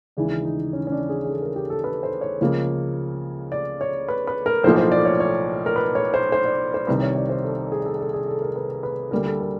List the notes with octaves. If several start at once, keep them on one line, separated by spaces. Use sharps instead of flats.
D#2 C#3 E3 G#3 D4
D#4
C#4
C#4
D4
G#4
G#4
A4
A#4
G4
A4
B4
C5
C#5
C#2 C#3 F3 A#3
D5
C#5
B4
B4
A#4
B1 A2 F3 A#3 C5
C5
D5
C#5
C#5
A#4
B4
C#5
C5
C5
D5
C5
C2 C3 D#3 B4
C#5
D5
C5
A4
G#4
A4
A4
G#4
A4
A#4
B4
B4
D2 D3 G3 A#3 A#4
A4
A#4